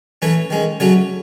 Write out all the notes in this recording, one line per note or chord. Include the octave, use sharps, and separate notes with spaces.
E3 A3 C#4 C#5
D#3 G#3 C#4
C#3 F#3 A3 C#4 C#5